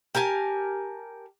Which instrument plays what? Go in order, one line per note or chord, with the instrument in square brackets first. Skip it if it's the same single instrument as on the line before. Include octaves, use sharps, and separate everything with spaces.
[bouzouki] G4 A#4 G#5 A5